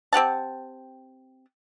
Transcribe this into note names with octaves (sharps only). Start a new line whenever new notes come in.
C4 G4 F#5 A5